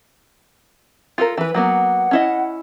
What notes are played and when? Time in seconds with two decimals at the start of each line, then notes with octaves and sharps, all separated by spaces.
1.18 F4 A4 A#4
1.37 E3 B4
1.54 F#3 A#3 B3 F#5
2.11 C#4 E4 D#5